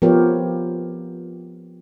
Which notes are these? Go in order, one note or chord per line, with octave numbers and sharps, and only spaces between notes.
F3 B3 F4 G4 A#4 C#5